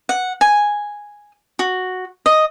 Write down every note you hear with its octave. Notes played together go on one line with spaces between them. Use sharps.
F#5
G#5
F#4
D#5